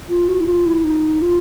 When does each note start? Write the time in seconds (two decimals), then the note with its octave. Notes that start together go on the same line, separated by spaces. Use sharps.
0.09 F4
0.28 F#4
0.40 E4
0.46 F4
0.66 E4
0.84 D#4
1.22 F4